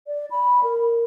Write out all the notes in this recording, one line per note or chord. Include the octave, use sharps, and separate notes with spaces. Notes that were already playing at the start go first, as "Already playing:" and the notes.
D5
B5
A#4